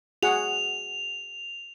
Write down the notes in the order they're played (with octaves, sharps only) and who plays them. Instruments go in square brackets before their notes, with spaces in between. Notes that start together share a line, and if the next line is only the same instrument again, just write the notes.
[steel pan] F#4 G#4 F#5 [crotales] F7